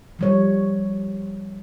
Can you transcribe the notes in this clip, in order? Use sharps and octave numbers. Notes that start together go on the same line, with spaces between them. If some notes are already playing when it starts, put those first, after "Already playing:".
F3 G3 C#5